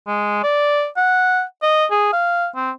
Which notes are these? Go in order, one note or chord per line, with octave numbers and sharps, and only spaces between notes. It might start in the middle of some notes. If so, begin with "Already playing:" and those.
G#3
D5
F#5
D#5
G#4
F5
C4